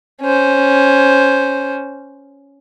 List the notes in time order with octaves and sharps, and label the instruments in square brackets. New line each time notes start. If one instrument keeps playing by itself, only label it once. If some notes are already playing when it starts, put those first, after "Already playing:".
[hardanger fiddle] C#4 C5